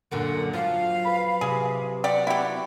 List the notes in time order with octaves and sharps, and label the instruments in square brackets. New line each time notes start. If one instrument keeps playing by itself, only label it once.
[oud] F#2 A#2 D3 [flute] F#5
[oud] F3 [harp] F#3 F4 [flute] F5
[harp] B4 B5
[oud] C3 [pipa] G#4
[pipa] G4 D5 [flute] F#5
[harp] C4 [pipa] E4 G4 [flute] F#4